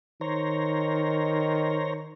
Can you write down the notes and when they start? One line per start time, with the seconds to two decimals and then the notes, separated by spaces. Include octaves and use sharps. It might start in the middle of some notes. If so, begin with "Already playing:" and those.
0.21 D#3 C5 C#5 A#5